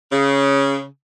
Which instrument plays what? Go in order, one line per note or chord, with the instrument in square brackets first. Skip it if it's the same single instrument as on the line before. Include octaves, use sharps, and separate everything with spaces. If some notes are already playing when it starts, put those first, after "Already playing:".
[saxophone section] C#3